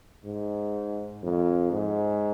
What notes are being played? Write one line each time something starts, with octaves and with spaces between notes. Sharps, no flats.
G#2
F2
G#2